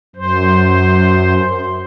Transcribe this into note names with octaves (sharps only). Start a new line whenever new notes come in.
F#2 C5